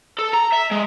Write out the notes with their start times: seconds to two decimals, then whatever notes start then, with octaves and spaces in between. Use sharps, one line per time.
0.19 A4
0.33 A#5
0.52 E5
0.71 G#3